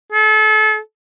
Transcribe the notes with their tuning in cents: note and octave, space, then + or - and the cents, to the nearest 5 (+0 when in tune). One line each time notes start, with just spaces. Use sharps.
A4 -35